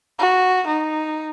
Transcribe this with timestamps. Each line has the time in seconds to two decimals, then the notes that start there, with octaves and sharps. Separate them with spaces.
0.19 F#4
0.67 D#4